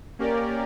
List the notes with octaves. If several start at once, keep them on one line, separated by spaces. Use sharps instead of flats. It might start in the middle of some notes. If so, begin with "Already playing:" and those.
A#3 C#4 G4 A#4 D5